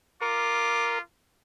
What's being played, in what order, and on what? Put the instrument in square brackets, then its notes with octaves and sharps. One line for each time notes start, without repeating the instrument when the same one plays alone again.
[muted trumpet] F4 [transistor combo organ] A#4 [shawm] D6